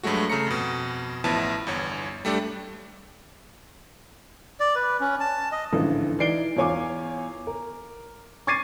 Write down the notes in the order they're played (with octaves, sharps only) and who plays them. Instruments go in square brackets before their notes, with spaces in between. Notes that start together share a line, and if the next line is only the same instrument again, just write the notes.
[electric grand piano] G2 F#3 G#3 A3 F#4
C#3 A3 A#5 A#6 C#7
F2 B2
A1 F3 B3 E4 A5
G1 E2 C#5
G3 A3 D4 G4
[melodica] D5
B4
C#4
A5
D#5
[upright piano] A1 G#2 D3 E3 F3
E3 D#4 D5 C7 D7 G7
E2 F4 C#5 G#5 D6
A#4
C#6 D6 G#6 A6 C7 D#7